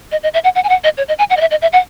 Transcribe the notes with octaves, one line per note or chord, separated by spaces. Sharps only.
D#5
D#5
E5
F#5
F#5
G#5
F#5
D#5
C#5
D#5
G#5
F#5
D#5
E5
D#5
E5
F#5